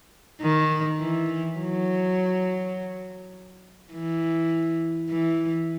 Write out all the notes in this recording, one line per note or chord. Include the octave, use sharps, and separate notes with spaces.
D#3
E3
F#3
E3
E3